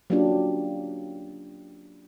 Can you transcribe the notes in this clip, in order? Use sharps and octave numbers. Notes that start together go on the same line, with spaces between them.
F#3 A#3 C#4 D4 F4 G4